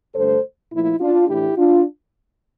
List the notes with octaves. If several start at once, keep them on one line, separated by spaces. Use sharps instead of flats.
G2 D3 A3 A4 C5
A#2 F3 A3 E4
D4 F4
A2 E3 A3 D4 E4 G4
D4 F4